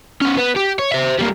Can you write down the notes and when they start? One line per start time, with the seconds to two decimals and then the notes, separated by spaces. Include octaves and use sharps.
0.22 B3 C#4
0.37 B3
0.56 G4
0.79 C#5
0.92 C5 E5
1.19 G3 A#3